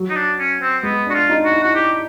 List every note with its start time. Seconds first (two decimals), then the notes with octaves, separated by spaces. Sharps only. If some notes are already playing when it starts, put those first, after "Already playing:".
Already playing: F#3
0.10 D#4
0.16 D4
0.39 C#4
0.61 C4
0.83 G#3 B3
1.06 D4
1.10 F#4
1.14 F4
1.30 D#4
1.45 F#4
1.52 E4
1.63 F#4
1.75 G4